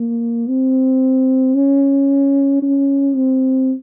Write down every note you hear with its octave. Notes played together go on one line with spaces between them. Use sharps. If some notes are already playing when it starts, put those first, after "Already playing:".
Already playing: A#3
C4
C#4
C#4
C4